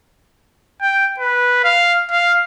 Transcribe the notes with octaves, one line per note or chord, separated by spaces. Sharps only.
G5
B4
F5
F5